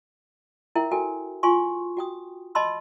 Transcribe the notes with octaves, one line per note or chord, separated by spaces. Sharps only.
E4 A#4 E5 G5
F#4 A4 A#4 G5 G#5
F4 G#5 C6 C#6
F#4 G5 D#6
D#5 A5 B5 C6 E6